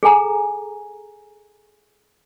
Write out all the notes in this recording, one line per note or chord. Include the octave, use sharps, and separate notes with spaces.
G#4 A4 G#5 A#5